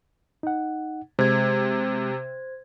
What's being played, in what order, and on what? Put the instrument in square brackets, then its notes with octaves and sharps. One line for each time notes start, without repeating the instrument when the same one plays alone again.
[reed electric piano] D#4 F#5
[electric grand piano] C3 [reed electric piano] G#3 [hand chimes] C5 G#6